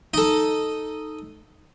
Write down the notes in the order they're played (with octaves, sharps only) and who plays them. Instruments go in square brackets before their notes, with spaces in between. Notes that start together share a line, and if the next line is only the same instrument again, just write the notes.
[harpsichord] D#4 A4